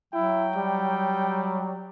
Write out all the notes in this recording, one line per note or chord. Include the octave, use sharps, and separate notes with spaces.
F#3 E4 G5
G3